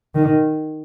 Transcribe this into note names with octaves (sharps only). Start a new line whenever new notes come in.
D#3